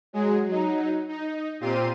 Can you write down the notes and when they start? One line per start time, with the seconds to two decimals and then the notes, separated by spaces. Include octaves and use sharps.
0.13 F#3 G#3 G#4
0.46 F#3 D#4
1.09 D#4
1.60 A#2 C4 F4 G4 C6 D#7